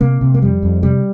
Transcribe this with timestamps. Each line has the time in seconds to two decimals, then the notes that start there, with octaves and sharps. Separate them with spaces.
0.01 C3 A#3
0.21 C3
0.34 A#3
0.42 F2 G3
0.62 F2
0.83 C3 G3